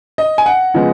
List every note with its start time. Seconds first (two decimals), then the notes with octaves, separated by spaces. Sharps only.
0.18 D#5
0.38 G#5
0.46 F#5
0.74 C#3 F3 G#3 B3